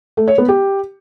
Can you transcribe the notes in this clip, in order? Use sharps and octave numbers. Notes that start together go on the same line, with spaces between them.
A3
C#5
B3
G4